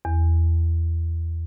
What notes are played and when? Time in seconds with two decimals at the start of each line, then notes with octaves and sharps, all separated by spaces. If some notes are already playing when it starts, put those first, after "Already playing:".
0.05 E2